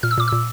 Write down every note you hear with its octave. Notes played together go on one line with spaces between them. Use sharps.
A#2 F6
E6
A#2 D6
A#2 E6